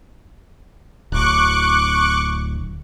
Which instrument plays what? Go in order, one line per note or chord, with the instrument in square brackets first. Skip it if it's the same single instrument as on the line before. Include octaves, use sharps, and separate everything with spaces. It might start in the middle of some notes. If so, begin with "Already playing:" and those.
[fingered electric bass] D1 [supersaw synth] C#6 D6 F#6